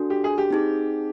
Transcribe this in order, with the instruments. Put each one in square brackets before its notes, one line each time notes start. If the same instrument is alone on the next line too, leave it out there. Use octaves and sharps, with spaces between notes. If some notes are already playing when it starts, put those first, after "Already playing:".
Already playing: [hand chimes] D4 F#4 A4
[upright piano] G4
G#4
G4
[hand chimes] C4 D#4 G#4